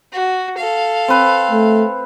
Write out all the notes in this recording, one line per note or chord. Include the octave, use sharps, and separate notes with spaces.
F#4
A4 F5
C4 B4
A3